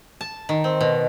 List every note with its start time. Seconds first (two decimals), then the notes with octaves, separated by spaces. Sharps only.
0.21 A5
0.49 D#3
0.64 C4
0.81 B2